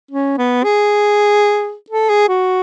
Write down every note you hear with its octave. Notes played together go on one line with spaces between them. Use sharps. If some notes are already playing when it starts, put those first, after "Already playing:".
C#4
B3
G#4
A4
G#4
F#4